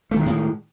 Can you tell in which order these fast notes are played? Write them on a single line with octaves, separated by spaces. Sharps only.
A3 D#3 G#3 A2